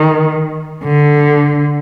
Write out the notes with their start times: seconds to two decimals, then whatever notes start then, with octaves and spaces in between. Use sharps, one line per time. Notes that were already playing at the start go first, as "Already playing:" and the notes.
Already playing: D#3
0.84 D3